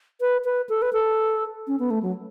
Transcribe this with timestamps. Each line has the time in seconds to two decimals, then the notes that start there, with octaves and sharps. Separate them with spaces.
0.21 B4
0.45 B4
0.69 A4
0.82 B4
0.93 A4
1.67 C#4
1.79 B3
1.90 A3
2.03 F#3